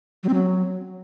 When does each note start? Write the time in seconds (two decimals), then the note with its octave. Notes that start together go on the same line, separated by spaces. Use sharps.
0.23 F#3
0.29 C4
0.34 F#3